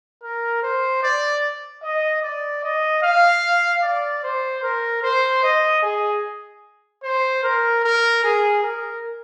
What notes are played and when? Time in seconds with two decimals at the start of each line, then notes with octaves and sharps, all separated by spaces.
0.23 A#4
0.63 C5
1.03 D5
1.83 D#5
2.23 D5
2.63 D#5
3.03 F5
3.83 D5
4.23 C5
4.63 A#4
5.03 C5
5.43 D#5
5.83 G#4
7.03 C5
7.43 A#4
7.84 A#4
8.24 G#4
8.63 A#4